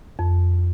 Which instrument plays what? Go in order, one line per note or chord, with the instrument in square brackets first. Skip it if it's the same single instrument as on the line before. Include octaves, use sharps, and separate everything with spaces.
[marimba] F2